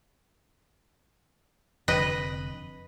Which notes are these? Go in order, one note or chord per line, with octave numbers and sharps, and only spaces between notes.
F1 F2 D3 B4 D#5